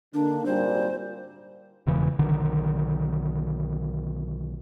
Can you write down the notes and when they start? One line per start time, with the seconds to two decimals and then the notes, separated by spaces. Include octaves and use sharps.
0.14 D3 D#3 A#3 D4
0.46 G#1 A#2 G3 C5
1.87 E1 C#3 E3
2.19 B1 D3 D#3